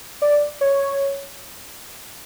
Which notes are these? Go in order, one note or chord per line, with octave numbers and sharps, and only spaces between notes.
D5
C#5